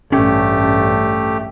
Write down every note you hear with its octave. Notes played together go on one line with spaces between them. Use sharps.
A1 G2 A3 C#4 G4